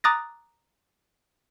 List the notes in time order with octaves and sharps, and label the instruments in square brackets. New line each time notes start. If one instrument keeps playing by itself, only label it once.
[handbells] A#5 D6 D#6 F#6 A6 A#6